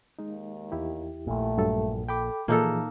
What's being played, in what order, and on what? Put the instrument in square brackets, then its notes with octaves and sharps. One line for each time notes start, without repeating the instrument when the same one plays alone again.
[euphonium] D#2 [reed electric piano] G#3 D#4
[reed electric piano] E2 E4 G4
[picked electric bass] A#1 A#2 [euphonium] A3
[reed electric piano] G2 F#3 A4
[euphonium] A4 [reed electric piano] G5 B5 D6
[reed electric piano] A#2 [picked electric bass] E3 F3 [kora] A#3 D#4 A4 [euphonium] G#4